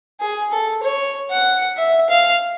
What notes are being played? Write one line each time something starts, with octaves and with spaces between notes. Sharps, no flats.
G#4
A4
C#5
F#5
E5
F5